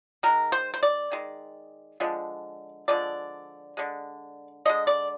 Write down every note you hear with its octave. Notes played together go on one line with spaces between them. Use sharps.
D#3 G#3 A#4
C5
C5
D5
D#3 G#3
D3 F3 G#3
D3 F3 G#3 D5
D3 G#3
D3 G#3 D#5
D5